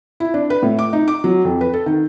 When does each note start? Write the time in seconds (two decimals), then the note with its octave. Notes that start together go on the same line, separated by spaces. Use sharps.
0.20 E4
0.34 D4
0.50 B4
0.63 A2
0.79 D6
0.93 D#4
1.08 D6
1.24 F#3
1.45 F2
1.61 B4
1.73 A4
1.86 D#3